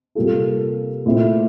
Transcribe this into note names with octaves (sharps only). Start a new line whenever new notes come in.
C3 G3 A#3 F4 A4
A#2 A3 C4 E4